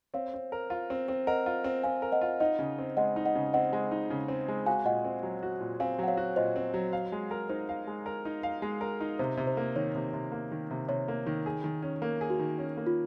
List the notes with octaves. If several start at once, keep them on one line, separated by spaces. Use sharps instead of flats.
C4 C#5 F5
C4
A#4
F4
C4
C4
A#4 D#5 F#5
F4
C4
C4 F5 G#5
A#4
D#5 F#5
F4
D#4 D#5 F#5
C#3
C4
G#3 D#5 F#5
D#4
D#5 F#5
C#3
C4 D#5 F#5
G#3
D#4
C#3
C4
G#3
F#4 F5 G#5
A#2 D#5 F#5
C4
F#3
F#4
A#2
C4 F5 G#5
F#3 F#5
C#5 F5
F#4
A#2 C5 D#5
C4
F#3
F5
G#3
A#4
D#4 C5
F5
G#3
A#4
D#4
F5
G#3
A#4
D#4
C3 C5
C3
C5
A#3
D#3 C#5
C3
C3
A#3
D#3
C3
C3 C#5
A#3
D#3
G#4
D#3
C#4
A#3 A#4
G#4
F#4
D#3
C#4
A#3
F4